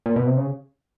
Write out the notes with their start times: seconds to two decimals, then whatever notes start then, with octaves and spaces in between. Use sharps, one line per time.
0.06 A#2
0.16 B2
0.27 C3
0.37 C#3